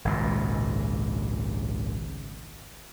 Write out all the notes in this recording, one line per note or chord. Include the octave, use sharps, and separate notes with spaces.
G#1 C#2 A#2